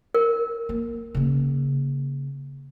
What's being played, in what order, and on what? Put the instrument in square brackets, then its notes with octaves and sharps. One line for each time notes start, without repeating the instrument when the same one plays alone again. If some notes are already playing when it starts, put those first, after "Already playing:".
[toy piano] A#4
[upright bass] A#3
C#3 A#3